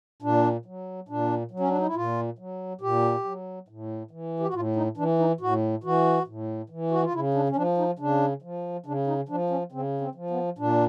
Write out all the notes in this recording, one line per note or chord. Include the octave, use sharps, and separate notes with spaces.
A#2 D4
F#3
A#2 D4
F#3
C#4
D4
D#4
E4
A#2 F4
F#3
A#2 G4
F#3
A2
E3
G4
F#4
A2 F4
D#4
E3 D4
D#4
A2 F#4
E3 F#4
A2
E3
F#4
F4
C#3 E4
D4
C#4
F3 D4
D#4
C#3 D4
F3
C#3 D4
D#4
F3 D4
C#4
C#3 C4
C4
F3
B3
A#2 D4